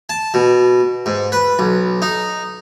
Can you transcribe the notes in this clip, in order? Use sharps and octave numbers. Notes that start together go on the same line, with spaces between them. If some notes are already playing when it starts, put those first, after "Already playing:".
A5
B2
G#2
B4
B1
D#4